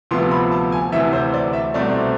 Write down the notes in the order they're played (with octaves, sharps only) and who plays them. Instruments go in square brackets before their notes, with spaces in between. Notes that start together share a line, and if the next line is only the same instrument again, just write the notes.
[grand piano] D2 C3 F3 B3 C6
B5
A5
G#5
D2 C3 E3 E5
C5
D5
E5
C2 B2 A3 C4 D5